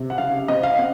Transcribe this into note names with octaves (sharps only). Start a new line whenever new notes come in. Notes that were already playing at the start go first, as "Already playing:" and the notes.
Already playing: C3
F#5
C#3 F5
C4 D#5
F5
C4 F#5